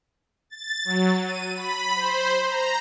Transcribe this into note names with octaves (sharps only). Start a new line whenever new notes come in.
A6
F#3
D#7
B5
C5
A#5